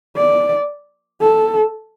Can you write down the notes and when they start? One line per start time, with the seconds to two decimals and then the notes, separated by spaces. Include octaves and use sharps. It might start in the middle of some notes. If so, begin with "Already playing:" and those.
0.17 D5
1.21 A4